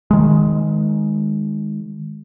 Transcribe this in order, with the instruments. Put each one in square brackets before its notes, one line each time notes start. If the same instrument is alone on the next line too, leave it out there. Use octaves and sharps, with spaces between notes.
[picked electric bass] D#3 G#3